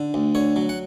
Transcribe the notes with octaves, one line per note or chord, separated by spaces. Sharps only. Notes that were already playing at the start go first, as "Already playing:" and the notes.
Already playing: D3
D2
D3 C#5
F#3
F#5